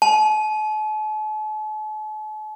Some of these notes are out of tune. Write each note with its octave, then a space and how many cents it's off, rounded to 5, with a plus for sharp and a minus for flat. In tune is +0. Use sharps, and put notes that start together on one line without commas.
A5 -45